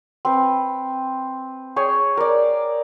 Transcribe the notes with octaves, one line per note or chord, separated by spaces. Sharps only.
C4 B4
G#4 C#5 G5 G#5
A#4 D5